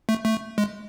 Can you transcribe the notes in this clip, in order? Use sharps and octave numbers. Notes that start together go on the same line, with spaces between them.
A3
A3
G#3